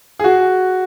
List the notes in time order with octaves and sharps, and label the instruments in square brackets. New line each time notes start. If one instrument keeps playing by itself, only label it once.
[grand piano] G#4
F#4